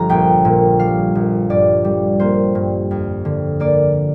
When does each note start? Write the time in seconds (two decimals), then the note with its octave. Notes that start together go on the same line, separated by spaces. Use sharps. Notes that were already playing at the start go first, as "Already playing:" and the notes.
Already playing: G1 F3 F5 A#5
0.09 A#1 G5
0.45 A#2
0.79 G3 F5
1.15 A#1
1.50 G2 D5
1.84 G3
2.20 A#3 C5
2.55 G2
2.91 F2
3.25 D3
3.60 A#3 D5